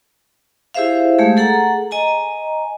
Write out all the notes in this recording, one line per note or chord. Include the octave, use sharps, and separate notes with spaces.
E4 G4 G#4 C5 E5 F5
G#3 A3 G4 G#4
G#4 A4 F#5 A#5
D#5 G#5 A#5